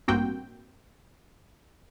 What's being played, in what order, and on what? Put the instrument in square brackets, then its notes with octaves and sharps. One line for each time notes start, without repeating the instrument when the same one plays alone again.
[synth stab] A1 G2 A#3 C4 F#4 G5